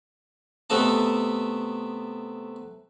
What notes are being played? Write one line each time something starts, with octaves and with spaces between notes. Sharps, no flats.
C3 A3 B3 A4 D#5 A5